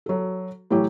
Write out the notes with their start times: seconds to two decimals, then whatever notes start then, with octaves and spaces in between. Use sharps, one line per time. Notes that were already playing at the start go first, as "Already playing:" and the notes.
0.06 F#3 A4
0.70 A2 E3 F#3 G4